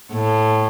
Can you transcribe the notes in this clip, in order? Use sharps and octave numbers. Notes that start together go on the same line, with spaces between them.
A2